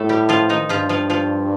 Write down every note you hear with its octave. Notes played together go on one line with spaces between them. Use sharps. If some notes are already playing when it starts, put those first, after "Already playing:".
Already playing: A2 A3 A4
G3 G4
F3 F4
D#3 D#4
G2 F3 F4
F3 F4
F3 F4